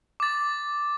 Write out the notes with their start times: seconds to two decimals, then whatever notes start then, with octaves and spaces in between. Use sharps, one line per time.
0.20 D6 A6